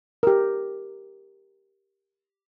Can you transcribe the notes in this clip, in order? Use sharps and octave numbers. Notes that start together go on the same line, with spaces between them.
G4 A#4